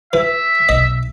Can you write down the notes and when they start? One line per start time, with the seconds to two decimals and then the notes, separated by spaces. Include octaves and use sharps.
0.13 E3 E5
0.69 B1 D#5